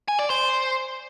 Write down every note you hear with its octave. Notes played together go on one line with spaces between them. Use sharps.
G#5
D5
C5